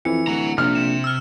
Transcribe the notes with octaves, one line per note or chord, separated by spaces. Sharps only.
F2 E3 C#7
D1 F#5 A#5
A#1 C3 F6
E7
E6 F6